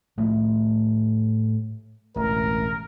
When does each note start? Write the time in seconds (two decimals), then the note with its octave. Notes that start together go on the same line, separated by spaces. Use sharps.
0.18 A2 F3 A3
2.16 E1 A1 A#4